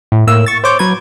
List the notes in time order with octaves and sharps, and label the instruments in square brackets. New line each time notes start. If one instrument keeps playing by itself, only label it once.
[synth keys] A2
A2 A#3 E6
C#6 A6
C5 C#5 D6 G6
F#3 B4 G#6